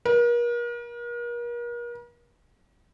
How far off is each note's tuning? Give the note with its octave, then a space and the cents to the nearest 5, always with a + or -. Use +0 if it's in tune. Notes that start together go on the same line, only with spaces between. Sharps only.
A#4 +40